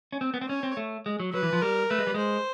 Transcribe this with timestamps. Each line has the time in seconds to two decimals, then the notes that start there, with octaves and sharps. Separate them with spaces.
0.12 C#4
0.21 C4
0.34 B3
0.41 C4
0.48 C#4 C#5
0.63 C4
0.77 A3
1.06 G#3
1.20 F#3
1.33 F#3 B4
1.43 E3
1.53 F3
1.62 G3 A#4
1.90 A3 B4
1.98 G#3
2.07 G3
2.14 G#3 C5